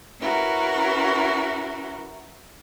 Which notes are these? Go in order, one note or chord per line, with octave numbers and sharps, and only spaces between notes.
C#4 E4 F#4 A#4 B4